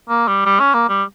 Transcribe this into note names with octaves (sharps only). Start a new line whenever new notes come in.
A#3
G3
G3
C#4
A#3
G3